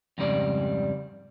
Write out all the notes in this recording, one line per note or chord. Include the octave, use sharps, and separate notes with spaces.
F2 G#2 C#3 G3 D5